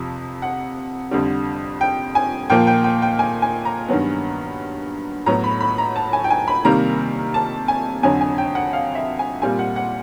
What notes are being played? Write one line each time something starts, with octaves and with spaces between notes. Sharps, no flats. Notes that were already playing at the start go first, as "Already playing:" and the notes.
Already playing: F2 C3 F3
F#5
F2 D3 G3
G5
G#5
A#2 F3 A#3 G5
G5
G5
G5
G#5
G#5
A#5
G2 D#3 F#3 B3
A2 F#3 B3 A#5
B5
B5
A#5
A5
G#5
G5
G#5
B5
C3 D#3 G3 A#3 A#5
A5
G#5
F2 D3 F#3 G#5
G#5
G5
F#5
F5
E5
G#5
A#2 G3 C4 G#5
F#5
F#5